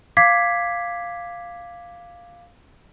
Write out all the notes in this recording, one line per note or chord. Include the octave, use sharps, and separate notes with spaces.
F5 D6 G#6 B6 C7